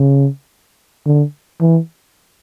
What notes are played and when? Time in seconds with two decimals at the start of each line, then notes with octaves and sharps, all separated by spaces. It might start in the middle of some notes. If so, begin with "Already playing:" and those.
Already playing: C#3
1.06 D3
1.61 E3